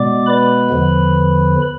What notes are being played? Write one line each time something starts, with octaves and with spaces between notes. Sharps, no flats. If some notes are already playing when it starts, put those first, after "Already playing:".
Already playing: B2 G#3 B3 D5 D6
B4 B5
E2 D3 F3